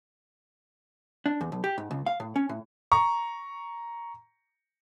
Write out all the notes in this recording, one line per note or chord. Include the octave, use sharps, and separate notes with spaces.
D4
E2
B1
G4
G#2
C#2
F5
A2
C#4
A2
A#5 C#6